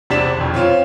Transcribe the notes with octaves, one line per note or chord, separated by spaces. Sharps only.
E2 C3 D4 D5 B6 E7
E1 F2
C4 C#4 F4